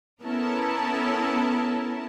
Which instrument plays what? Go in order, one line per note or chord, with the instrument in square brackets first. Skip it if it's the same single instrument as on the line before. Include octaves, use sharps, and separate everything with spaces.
[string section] B3 C#4 E4 A4 A#4 A5